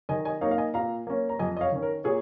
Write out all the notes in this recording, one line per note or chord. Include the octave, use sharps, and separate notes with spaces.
D#3 D#5 G#5
D#5 G#5
A#3 D#4 C#5 F5
F5
D#5 G#5
A#2 F5 A#5
A#3 C#4
A#5
F2 D#5 G#5
D#5
C#5 F5
D#3 C#4
A#4
A#2 G#4 C#5